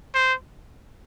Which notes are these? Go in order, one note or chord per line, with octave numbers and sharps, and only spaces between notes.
C5